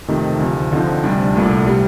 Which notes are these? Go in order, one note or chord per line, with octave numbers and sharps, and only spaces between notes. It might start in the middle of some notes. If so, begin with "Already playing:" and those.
F2 C3 D#3 A3 D#4
D2 C3 F3
D3 F3 C4 D#4
D2 C3 G3 D4
C2 A#2 A3
C3 G3